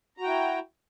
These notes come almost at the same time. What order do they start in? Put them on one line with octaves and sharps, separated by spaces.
A#5 F#4 G5 E4